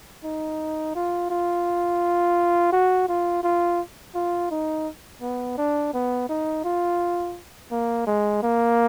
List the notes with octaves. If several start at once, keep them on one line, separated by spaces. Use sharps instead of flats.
D#4
F4
F4
F#4
F4
F4
F4
D#4
B3
D4
B3
D#4
F4
A#3
G#3
A#3